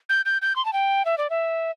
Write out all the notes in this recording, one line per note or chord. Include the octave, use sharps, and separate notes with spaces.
G6
G6
G6
C6
A5
G5
E5
D5
E5